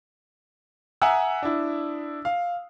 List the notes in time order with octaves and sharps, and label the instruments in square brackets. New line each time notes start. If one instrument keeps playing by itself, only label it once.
[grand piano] E5 F#5 G#5 A#5 D#6 E6
D4 E4
F5